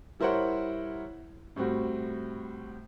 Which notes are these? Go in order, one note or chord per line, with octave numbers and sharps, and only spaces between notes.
G3 E4 A#4 C5 C#5 F#5
A2 G3 C4 F#4